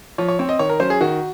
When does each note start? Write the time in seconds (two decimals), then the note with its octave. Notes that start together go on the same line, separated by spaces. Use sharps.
0.18 F3 C#5
0.28 C#5
0.39 C4 C#5
0.49 D#5
0.59 D#3 C#5
0.69 A#4
0.80 F#3 C#4 C5
0.90 G#4
1.01 D#3 F#4